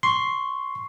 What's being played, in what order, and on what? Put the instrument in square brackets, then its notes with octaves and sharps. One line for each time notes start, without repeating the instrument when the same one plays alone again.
[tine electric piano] C6 [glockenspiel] C#6 C7